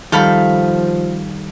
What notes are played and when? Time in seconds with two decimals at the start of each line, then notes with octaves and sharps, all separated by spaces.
0.12 D#3 F3 G3 A4 F5 B5